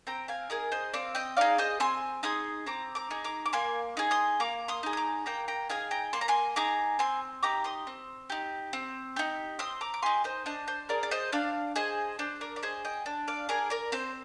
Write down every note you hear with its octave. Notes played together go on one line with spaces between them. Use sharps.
C4 G5 A#5
F5 G#5
D#4 G#4 A#4
C5 D#5
C4 D5 F5
D#5 G5
D#4 G#4 D5 F5
C5 D#5
C4 G#5 C6
D#4 G#4 C6 D#6
C4 A#5 D6
A#5 D6
D#4 G#4
A#5 D6
D6
A#3 G#5 C6
D#4 G#4
C6 D#6
A#3 A#5 D6
C6 D#6
D#4 G#4
D#6
A#5 D6
A#3 G5 A#5
G5 A#5
D#4 G#4 F5 G#5
G5 A#5
A#3 C6
A#5
G#5 C6
D#4 G#4 A#5 D6
C4 G#5 C6
D#4 G4 A#5 D6
C6 D#6
C4
D#4 G4
C4
D#4 G4
C4 C6 D#6
A#5 D6
D6
D#4 G4 G#5 C6
C5 D#5
D4 C5 D#5
C5
G#4 A#4 D5
D5
C5 D#5
D4 D5 F5
G#4 C5 D#5
D4 C5
A#4 D5
D5
G#4 C5 D#5
D#5 G5
D4
D5 F5
G#4 A#4 D5
A#4 D5
C4 C5